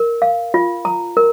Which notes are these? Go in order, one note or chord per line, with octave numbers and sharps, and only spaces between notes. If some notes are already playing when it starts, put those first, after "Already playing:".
Already playing: A#4
F5
F4
A#5
A#4